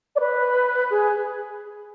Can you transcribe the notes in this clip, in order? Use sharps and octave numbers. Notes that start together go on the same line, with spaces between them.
D5
B4
G#4